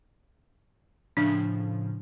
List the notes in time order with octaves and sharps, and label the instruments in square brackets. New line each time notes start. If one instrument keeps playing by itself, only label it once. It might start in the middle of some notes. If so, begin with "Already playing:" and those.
[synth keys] A2 C#3 F3 [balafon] D4